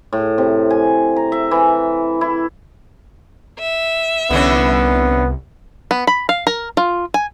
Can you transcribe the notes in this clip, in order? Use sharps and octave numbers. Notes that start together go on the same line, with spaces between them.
A2
C3
G#5
A#5
E5
E3
E4
E5
C2 D3 E3 B3 C#4
B3
B5
F5
A#4
F4
G#5